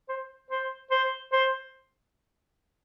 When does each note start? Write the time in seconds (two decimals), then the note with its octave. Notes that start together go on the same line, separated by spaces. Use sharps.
0.09 C5
0.50 C5
0.91 C5
1.33 C5